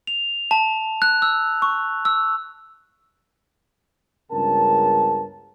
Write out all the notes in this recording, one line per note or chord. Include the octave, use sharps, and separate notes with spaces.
F7
A5
F#6
E6
C#6
E6
C#2 G2 C#3 B3 A#4 A5